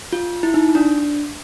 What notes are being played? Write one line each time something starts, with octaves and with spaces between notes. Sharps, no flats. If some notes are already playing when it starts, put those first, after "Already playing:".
F4
E4
D#4
D4